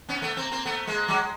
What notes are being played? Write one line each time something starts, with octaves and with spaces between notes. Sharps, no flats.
B3 C#4
A3 B3
A#3 C4
A#3 C4
A3 B3
G#3 A#3
F#3 G#3